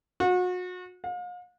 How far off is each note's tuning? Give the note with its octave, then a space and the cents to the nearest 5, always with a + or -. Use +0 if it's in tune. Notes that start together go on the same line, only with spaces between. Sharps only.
F#4 -35
F5 +40